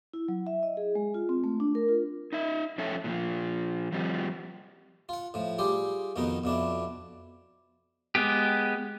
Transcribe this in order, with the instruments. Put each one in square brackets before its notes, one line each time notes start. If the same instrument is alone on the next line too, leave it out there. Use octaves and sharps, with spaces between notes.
[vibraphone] E4
F#3
E5
D#5
G#4
G#3
F4
C4
A3
D4
A#4
F4
[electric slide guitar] D#4 E5
F2 C#4 A4 E5 A5
A#2 D#3 F3
F3 G3 C4 G4
[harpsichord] F4 F#5
A2 F3
G3 F4 G4 G#4
F2 B2 D#3 B3 D#4
F2 B2 D4 E4
[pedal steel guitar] G#3 B3 G4